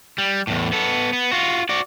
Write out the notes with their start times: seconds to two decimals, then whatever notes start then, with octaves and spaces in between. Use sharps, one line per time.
0.18 G3
0.47 E2 A2
0.72 B3 A4
1.13 B3
1.32 F4 F#4
1.69 F#4 D5